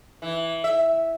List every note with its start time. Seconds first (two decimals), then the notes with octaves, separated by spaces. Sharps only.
0.22 E3
0.64 E5